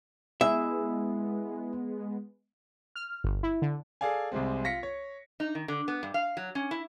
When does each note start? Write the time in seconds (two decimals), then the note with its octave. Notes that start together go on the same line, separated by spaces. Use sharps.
0.41 G#3 B3 E4 G#4 E5
2.96 F6
3.24 G1
3.43 E4
3.62 D3
4.01 G#4 A4 D5 F5 G#5
4.32 C2 C3 G#3 C4
4.64 F4 A#6 B6 C#7
4.83 C#5
5.40 D#4
5.55 D#3
5.68 D3
5.88 B3
6.03 G2
6.14 F5
6.37 F#3
6.55 C#4
6.71 E4